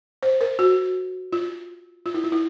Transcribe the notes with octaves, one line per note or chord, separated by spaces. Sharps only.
C5
A#4
F#4
F4
F4
E4
F4
E4